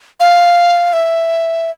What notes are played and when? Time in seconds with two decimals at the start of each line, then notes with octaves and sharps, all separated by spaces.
0.20 F5
0.93 E5